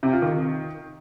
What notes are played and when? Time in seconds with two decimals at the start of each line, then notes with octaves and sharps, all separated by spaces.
0.03 C3
0.13 F4
0.22 D#3